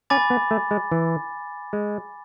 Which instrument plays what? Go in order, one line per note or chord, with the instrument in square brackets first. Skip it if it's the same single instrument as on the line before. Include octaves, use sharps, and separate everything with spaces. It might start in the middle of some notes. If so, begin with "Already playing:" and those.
[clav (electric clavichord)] C#4 [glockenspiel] G#5 B5 D6 A6
[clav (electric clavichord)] B3
A3
G#3
E3
G#3